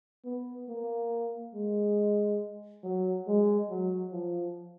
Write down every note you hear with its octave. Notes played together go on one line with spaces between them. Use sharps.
B3
A#3
G#3
F#3
G#3
F#3
F3